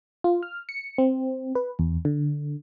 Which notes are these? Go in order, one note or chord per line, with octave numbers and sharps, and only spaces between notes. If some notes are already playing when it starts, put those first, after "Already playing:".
F4
F6
C#7
C4
B4
E2
D3